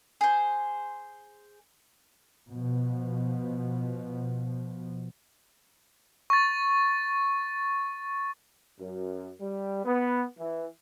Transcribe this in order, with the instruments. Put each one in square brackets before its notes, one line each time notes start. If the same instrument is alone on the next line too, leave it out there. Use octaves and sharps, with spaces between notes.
[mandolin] G#4 C5
[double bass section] B2 F3
[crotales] C#6 A6
[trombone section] F#2
G3
B3
E3